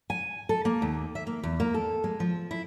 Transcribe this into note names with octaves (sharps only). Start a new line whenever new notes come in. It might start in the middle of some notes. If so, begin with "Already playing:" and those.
G#5
A4
A#3
D#2
E5
A#3
E2
A#3
A4
G#3
F3
E4